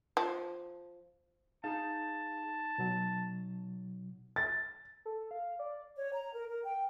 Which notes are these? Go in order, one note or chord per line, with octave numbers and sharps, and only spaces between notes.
F3
D#4 G#4 F5 A5 A#5
B2 F#3
A6
A4
F5
D5
C#5
A#5
A#4
A#4
G5